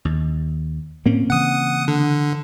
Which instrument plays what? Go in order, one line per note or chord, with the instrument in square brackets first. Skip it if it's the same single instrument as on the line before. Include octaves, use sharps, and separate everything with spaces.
[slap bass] D#2
[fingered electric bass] A2 [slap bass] A#3 C4 C#4
[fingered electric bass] C#3 E3 [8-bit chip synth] F#5 D#6
[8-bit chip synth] D3